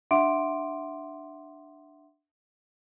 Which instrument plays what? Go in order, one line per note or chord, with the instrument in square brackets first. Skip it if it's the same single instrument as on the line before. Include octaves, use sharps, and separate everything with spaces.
[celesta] D4 E5 F#5 C6 D6 D7